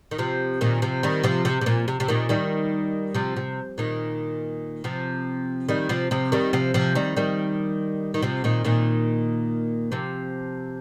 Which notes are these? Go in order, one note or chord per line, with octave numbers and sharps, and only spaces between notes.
D#3
C3 F3
A#2 D#3
C3 F3
D#3 G3
C3 F3
C3
C3
A#2
C3
C3
A#2 D#3
D#3 G3
C3 F3
C3
A#2 D#3
C3 F3
D#3 G3
C3 F3
C3 F3
D#3 G3
C3 F3
C3 F3
D#3 G3
D#3 G3
D#3
C3 F3
A#2 D#3
A#2 D#3
C3 F3